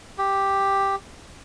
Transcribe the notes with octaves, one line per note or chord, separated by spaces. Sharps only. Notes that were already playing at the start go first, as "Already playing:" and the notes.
G4